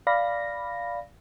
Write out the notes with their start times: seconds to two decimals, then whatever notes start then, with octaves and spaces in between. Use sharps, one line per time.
0.07 D5 F5 B5 A#6